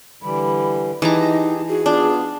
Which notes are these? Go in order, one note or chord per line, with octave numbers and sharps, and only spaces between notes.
D3 E3 G3 B5
E3 D#4 G4 G#4 D#5 A5 A#5
F#4 G#4
B3 D4 F4